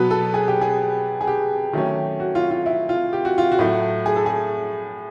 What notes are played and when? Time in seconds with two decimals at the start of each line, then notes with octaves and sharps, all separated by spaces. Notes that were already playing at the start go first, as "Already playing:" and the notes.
Already playing: B2 F#3 B3 B4
0.10 A4
0.34 G#4
0.48 G4
0.61 G#4
1.21 G#4
1.27 G4
1.73 D#3 F#3 A3 C#4
2.20 F#4
2.35 F4
2.51 F4
2.66 E4
2.89 F4
3.13 G4
3.25 F#4
3.38 F4
3.52 F#4
3.59 A2 F#3 A3
4.06 G#4
4.16 A4
4.26 G#4